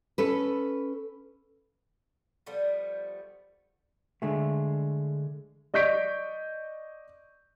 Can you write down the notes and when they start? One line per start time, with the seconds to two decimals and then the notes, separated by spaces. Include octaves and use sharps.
0.18 C#4 A4 B4
2.46 F3 G3 A3 B3
4.22 D3 G#3 A3
5.74 D5 D#5 C#6 G6 B6 D7